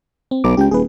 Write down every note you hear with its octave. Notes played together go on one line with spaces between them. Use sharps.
C4
B1 D6
C#2 G4 G5
D#1 G#4 B4